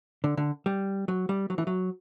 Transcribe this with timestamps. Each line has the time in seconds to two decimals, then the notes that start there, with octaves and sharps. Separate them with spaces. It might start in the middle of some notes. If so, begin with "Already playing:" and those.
0.24 D3
0.37 D3
0.66 G3
1.08 F#3
1.29 G3
1.50 F#3
1.58 E3
1.67 F#3